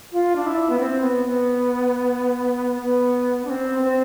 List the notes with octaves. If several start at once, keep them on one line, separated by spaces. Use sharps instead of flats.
F4
D4
E4
B3
C4
B3
B3
B3
D4
C4
C4